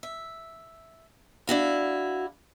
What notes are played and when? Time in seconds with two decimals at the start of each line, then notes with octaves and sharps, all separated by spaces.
0.03 E5
1.47 D4 E4 F#4 F5